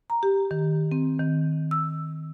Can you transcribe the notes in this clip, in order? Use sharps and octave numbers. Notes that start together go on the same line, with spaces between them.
A#5
G4
D#3
C4
D#3
E6